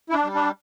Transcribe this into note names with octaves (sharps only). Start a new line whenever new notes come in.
E4
D4
G3
D4